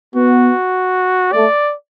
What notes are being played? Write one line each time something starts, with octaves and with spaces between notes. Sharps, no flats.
B3 F#4
A3 D5